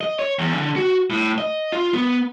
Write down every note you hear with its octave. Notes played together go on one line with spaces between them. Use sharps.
D#5
C#5
E2
D3
F#4
A2
D#5
F4
B3